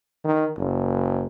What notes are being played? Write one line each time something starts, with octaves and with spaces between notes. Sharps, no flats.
D#3
F#1